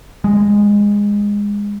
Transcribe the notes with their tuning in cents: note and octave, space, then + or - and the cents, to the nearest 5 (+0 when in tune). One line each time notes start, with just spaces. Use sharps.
G#3 -20